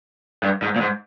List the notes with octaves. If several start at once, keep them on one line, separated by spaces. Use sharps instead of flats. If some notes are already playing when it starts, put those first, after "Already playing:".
G2
G#2
A#2
G#2